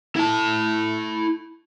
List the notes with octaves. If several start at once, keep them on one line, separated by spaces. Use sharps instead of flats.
E4 A5